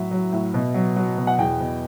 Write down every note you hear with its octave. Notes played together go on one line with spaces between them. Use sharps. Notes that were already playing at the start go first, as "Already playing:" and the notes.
Already playing: A2 F#3 E5
F#3
A2
B2
F#3
F#3
B2
F#5
E2 G5
B2